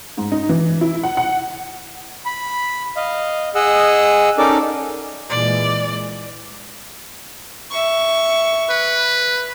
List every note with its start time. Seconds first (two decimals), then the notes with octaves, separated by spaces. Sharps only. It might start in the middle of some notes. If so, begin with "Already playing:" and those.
0.17 G#2
0.32 D#4
0.49 E3
0.81 E4
1.03 F#5
1.17 F#5
2.26 B5
2.96 D#5 F5
3.55 G#4 D#5 F#5 E6
4.38 C#4 D#4 A4 A#4 D5 D6
5.29 A#2 E3 G#3 D5
7.70 E5 C#6
8.70 B4